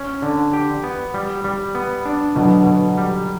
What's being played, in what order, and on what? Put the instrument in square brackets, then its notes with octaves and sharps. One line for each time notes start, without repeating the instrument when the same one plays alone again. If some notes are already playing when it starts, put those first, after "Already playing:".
Already playing: [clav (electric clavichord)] C#4
D3
G4
B3
G3
G3
B3
D4
[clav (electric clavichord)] B2 [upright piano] D3 F#3
[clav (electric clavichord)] B2
G3